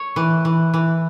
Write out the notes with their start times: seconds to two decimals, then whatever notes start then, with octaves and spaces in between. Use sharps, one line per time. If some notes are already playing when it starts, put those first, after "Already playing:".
Already playing: C#5
0.16 E3
0.45 E3
0.74 E3